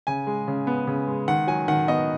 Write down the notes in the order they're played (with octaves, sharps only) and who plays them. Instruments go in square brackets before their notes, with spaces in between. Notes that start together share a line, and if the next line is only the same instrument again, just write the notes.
[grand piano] C#3 G#5
G#3
C#3
B3
C#3
G#3
D#3 F#5
F#3 G#5
D#3 F#5
B3 D#5